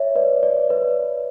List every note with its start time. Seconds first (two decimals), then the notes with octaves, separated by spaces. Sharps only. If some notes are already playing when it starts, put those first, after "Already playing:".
Already playing: C#5 E5
0.15 B4 D5
0.43 B4 D5
0.70 B4 D5